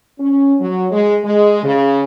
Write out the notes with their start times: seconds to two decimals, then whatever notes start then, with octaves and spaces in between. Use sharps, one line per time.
0.18 C#4
0.60 F#3
0.91 G#3
1.24 G#3
1.62 C#3